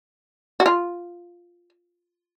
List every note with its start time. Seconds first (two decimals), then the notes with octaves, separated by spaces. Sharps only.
0.60 F#4
0.66 F4